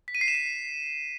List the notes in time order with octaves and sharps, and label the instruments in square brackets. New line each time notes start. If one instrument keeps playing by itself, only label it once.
[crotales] B6
D#7
C7
E7
C7